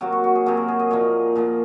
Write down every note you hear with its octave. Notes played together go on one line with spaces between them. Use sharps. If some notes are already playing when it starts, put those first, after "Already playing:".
C3 F#3 A#3 F#4
F#4
F#4
G#4
C3 F#3 A#3 G#4
A#4
G#4
D#5
A#2 F3 A#3 C#5
A#2 F3 A#3